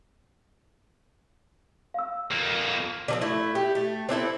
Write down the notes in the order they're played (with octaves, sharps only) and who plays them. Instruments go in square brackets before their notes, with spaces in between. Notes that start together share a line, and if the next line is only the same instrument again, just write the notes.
[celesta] F5 E6
[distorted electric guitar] F2 A#3
[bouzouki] D3 F3 C4
A3 E4
G4
A3
C4 D4 E4 A4